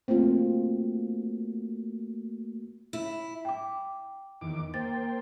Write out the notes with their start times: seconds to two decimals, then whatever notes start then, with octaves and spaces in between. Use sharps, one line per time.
0.08 A3 A#3 C4 F4 F#4
2.93 E4
3.45 G5 D6
4.41 E2 D#3 D6
4.74 A#3 C5 G5 A6